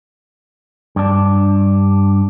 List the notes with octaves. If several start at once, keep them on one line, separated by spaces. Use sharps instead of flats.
G2 D4